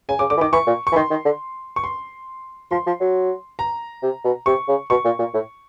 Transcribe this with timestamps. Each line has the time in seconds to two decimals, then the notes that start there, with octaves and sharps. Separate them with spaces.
0.09 C#3 G#5
0.19 C#3 D6
0.30 D3 D6
0.37 E3
0.41 D#3 D6
0.53 E3 C#6
0.67 A#2
0.87 C#6
0.92 E3
0.96 D#3 C6
1.10 D#3
1.25 D3
1.76 C#6
1.84 C6
2.71 F3 C6
2.86 F3
3.00 F#3
3.59 A#5
4.03 C3
4.24 B2
4.46 C3 C#6
4.68 C#3
4.90 B2 C#6
5.05 A#2
5.19 A#2
5.34 A2